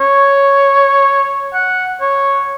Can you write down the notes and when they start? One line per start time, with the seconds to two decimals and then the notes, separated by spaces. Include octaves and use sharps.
0.01 C#5
1.54 F#5
2.01 C#5